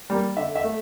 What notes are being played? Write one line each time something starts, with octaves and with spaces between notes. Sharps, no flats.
G3 A#3
D3 E5
E5
A3